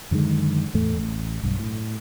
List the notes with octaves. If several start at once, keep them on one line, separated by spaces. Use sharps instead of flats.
F#2 D3 D#3 G#3
E2 A2 A3
A1
B1 G2
A2